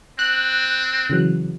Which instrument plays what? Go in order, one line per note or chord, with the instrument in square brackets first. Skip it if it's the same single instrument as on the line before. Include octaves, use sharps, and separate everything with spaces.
[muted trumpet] C4 [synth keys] F#6
[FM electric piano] C#3 E3 F#3